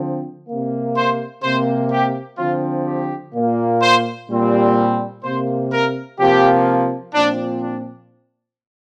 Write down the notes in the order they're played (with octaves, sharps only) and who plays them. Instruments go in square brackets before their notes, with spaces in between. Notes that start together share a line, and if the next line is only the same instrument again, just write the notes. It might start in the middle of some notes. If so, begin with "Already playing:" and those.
Already playing: [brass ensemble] D3 F3 C4
C3 A#3
C5
C3 A#3 C5
G4
D3 F3 C4 F4
G4
A#2 A#3
C5
A#2 G3 C4
C3 A#3 C5
A#4
C3 F3 A#3 G4
A#2 F3 C4 D4
D4